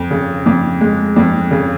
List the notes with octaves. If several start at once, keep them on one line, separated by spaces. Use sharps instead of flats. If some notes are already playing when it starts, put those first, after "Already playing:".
Already playing: F2
C#3
F2
G#3
F2
C#3